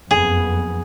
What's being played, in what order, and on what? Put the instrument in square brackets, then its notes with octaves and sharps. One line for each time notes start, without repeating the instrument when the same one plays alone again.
[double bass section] F#1 F2 B3 [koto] G#4